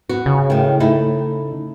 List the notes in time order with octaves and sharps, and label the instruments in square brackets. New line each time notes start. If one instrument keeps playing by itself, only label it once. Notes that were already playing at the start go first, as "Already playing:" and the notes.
[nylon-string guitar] B3 F#4
[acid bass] C#3
[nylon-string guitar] A2 D#3
A3 D#4 E4